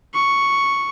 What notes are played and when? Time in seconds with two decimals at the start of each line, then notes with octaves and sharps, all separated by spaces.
0.15 C#6